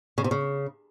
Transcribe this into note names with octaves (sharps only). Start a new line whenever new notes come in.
C#3
C3
C#3